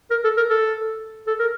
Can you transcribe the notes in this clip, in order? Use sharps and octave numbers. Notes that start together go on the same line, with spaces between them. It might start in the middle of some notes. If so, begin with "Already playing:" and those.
A#4
A4
A#4
A4
A4
A#4